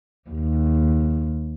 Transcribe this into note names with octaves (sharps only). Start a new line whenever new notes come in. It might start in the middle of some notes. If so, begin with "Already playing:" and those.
D#2